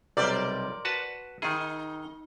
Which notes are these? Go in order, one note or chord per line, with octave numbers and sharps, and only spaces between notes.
B1 C3 G3 A#4 C5 D5
F#4 B4 A5
D#3 D#4 G#4